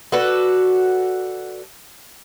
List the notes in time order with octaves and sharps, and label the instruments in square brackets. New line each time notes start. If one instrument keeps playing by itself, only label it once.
[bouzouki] F#4 A4 B4 D5